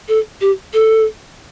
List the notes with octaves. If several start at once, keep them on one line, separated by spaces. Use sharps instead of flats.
A4
G4
A4